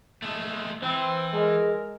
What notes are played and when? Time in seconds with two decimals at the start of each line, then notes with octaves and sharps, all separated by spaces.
0.22 G#3 A3
0.83 E3 C4
1.34 G#3 A#4